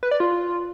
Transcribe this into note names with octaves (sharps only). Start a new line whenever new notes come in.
B4
D5
F4